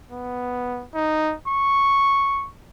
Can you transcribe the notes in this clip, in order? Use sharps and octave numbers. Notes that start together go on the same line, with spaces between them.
B3
D#4
C#6